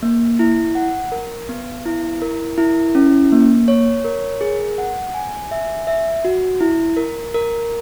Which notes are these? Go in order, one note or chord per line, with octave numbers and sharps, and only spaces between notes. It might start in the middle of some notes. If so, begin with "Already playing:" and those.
A#3
E4
F#5
A#4
B3
E4
A#4
E4
C#4
A#3
C#5
A#4
G#4
F#5
G#5
E5
E5
F#4
E4
A#4
A#4